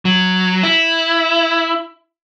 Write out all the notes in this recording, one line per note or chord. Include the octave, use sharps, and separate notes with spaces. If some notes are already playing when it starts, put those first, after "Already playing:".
F#3
E4